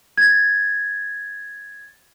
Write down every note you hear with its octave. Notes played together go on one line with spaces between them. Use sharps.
G#6 A6